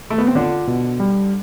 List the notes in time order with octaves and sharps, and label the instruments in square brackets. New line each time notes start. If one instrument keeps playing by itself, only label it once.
[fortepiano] A3
B3
C4
[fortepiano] D3 D4 [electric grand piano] F4
[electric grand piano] B2
G3